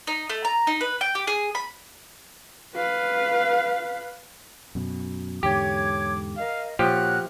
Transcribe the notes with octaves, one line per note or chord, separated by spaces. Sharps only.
D#4
A3
A#5
D#4
B4
G5
G4
G#4
B5
B4 F5
F#2 B2
E2 G#2 D3 G4 C#5 D6 G#6
A#4 D#5 F5
A#2 F3 F#4 G4 C#5 F6 F#6